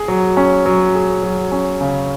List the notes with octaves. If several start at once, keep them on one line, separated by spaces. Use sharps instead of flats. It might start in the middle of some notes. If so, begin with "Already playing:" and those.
Already playing: G#4
F#3
C#4
F#3
G#4
F#3
C#4
C#3